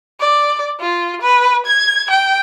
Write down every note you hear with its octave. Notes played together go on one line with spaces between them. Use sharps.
D5
F4
B4
G#6
G5